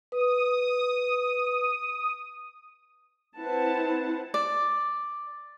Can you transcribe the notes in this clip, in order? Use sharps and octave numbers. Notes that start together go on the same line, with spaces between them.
B4 D#6
C4 E4 B4 C5 F#5 A5
D5